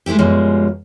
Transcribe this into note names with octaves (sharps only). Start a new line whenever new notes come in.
G#3 A3 B3 E4 G4
F#2 B2 F3 G3 G#3